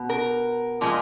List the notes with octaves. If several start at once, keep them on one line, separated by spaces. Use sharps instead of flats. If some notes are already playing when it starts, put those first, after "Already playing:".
Already playing: B2
A#4
A#2 F3 G#3